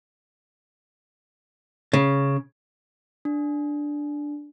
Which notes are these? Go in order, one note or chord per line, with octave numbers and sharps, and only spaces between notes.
C#3
D4